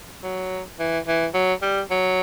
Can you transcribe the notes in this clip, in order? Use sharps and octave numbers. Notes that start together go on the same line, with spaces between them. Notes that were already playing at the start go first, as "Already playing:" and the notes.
F#3
E3
E3
F#3
G3
F#3